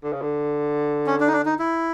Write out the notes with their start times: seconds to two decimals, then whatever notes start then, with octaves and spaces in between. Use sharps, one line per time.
0.04 D3
0.13 C#3
0.22 D3
1.06 C#4
1.20 D4
1.28 D#4
1.33 D4
1.45 D#4
1.59 E4